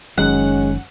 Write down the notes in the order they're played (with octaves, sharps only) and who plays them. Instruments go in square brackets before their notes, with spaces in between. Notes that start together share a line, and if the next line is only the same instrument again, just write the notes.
[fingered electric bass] F#1 D#3 F#3 [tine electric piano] G#3 [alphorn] C#4 [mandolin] F#5